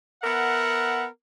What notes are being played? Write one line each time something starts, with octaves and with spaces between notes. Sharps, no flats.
B3 A#4 E5 F#5